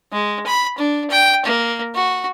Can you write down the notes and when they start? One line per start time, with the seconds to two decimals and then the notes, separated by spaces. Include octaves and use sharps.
0.12 G#3
0.46 B5
0.78 D4
1.10 G5
1.45 A#3
1.95 F#4